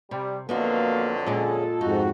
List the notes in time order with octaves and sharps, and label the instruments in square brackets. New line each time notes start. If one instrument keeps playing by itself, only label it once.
[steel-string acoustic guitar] C3 [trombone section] G3
[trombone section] F2 D3 F#3 [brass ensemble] A#3 F5 [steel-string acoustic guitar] B3 D#4 F#4
[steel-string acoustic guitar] A#2 G#3 [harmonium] C#4 G#4 [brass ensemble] F4 A4
[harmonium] F2 G#2 F#4 [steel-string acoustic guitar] D#4